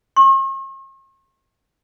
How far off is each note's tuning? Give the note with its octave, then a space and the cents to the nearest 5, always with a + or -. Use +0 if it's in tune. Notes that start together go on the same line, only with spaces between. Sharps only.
C#6 -45